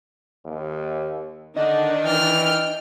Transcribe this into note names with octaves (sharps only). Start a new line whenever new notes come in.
D#2
D3 D#3 D4 D#4 D#5
E3 G5 F6